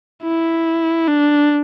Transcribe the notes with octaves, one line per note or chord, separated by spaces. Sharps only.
E4
D4